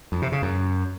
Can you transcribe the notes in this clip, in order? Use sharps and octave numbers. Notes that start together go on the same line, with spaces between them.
F2
C3
C#3
F#2